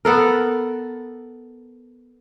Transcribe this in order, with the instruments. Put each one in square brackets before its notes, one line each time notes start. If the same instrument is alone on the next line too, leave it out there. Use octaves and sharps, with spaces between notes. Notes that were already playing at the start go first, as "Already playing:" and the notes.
[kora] B3 A4 A#4